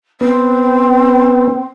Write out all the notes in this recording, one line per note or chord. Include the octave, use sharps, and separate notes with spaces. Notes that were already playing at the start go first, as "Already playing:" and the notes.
B3 C4